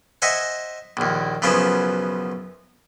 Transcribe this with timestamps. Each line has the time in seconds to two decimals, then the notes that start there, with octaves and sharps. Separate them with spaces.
0.22 C5 D#5 E5 F#5 G#5
0.97 A#1 D#2
1.42 B1 F#2 C#3 F3 B3 C5